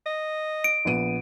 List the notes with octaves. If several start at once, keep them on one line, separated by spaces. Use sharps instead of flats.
D#5
D7
A#1 B3 D#7